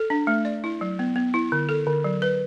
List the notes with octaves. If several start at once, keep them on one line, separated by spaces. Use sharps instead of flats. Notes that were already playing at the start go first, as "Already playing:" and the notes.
Already playing: A4
D4
A3
D5
E4
F#3
B3
B3
E4
D3
A4
D3
F#3
B4